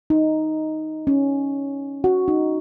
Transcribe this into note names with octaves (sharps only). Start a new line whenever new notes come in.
D#4
C#4
F#4
D#4